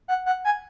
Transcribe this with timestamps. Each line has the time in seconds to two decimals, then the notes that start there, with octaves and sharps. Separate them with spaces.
0.08 F#5
0.26 F#5
0.45 G#5